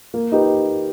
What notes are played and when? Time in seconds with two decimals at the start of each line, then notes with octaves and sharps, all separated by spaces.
0.14 A#3
0.32 D#4 G4 B4